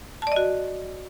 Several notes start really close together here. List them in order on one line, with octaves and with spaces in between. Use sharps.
A5 D5 D#5 F#4